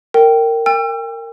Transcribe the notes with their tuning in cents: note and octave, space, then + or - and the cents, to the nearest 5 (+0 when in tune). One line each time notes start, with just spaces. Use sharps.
A#4 -20 G5 -10
G5 +35 E6 +40